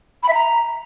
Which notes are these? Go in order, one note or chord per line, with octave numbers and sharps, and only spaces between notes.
B5
E5
A#5